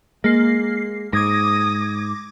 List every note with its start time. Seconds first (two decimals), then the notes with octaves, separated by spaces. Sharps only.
0.24 G#3 A#3 C7
1.13 G#2 D6 D#6 G#6 A#6